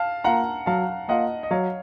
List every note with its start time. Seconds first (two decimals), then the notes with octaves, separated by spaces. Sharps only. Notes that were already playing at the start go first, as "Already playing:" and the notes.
Already playing: F5 A5
0.24 A#3 F4 F#5 A#5
0.66 F#3 F5 A5
1.08 A#3 F4 D#5 F#5
1.43 D#5
1.51 F#3 C#5 F5